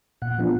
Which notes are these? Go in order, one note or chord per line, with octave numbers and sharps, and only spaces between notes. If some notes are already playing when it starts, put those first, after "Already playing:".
A#2 F#5
F3 B3 D4 F4